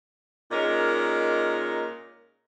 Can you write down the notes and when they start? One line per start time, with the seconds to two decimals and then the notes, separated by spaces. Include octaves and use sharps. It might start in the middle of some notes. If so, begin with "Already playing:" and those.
0.51 A#2 G#3 C#4 D#4 A#4